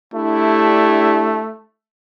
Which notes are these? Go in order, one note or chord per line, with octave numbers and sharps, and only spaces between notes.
A3 D4 E4 G4